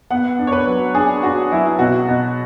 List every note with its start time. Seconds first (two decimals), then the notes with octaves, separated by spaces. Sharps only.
0.11 B3 F#5
0.39 D4
0.47 C#5
0.52 B4
0.67 F#3
0.94 D4 G#4
1.23 D4 F#4
1.52 F#3 E4
1.79 B2 F#4
2.08 B2